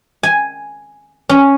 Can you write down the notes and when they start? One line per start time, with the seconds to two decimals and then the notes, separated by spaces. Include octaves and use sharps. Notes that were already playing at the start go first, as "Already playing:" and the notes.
0.23 G#5
1.29 C#4